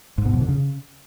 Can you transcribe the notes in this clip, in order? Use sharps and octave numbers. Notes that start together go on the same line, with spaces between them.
G#2
B2
F2
D3
C#3